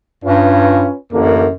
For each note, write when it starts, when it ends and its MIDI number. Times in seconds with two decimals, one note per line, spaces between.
0.24 0.86 43
0.24 0.96 61
0.24 0.96 65
0.24 0.96 71
1.13 1.46 33
1.13 1.52 42
1.13 1.46 50
1.13 1.46 58